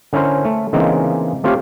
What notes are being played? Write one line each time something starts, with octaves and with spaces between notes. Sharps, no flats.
D3 C#4 E4 A#4 C5
A3
C#3 E3 G#3 A#3 C4 D#4
A3 C4 F4 G4 C#5 F5